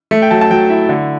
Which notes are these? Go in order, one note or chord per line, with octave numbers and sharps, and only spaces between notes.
A3
G5
F#3 A5
A5
F#3 G5
E4
D3